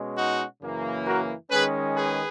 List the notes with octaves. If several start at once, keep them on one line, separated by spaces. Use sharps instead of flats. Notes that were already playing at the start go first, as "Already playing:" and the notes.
Already playing: B2 G#3 C#4
D#4 F#4
F#2 C#3 E3 A#3
F#4 A#4
D#3 G#3 C#4 G#4 B4
G#4 B4